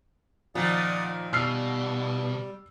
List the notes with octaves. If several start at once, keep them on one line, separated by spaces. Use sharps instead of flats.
A#2 D#3 F3 D5 F#5 D#6
B2 G3 E6 F6 C7